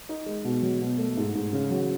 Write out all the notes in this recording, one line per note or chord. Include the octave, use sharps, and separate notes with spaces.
D#4
G#3
B2
F#3
B2
A3
G#2
G#2
C#3
F#3